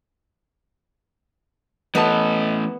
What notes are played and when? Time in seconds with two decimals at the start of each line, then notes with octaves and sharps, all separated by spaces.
1.95 E3 A3 B3 D#5 A5